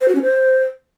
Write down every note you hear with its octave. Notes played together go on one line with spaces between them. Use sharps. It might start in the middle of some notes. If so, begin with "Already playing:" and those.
C5
F#4
C#4
C5